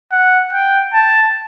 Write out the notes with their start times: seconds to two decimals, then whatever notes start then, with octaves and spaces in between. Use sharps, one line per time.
0.12 F#5
0.53 G5
0.93 A5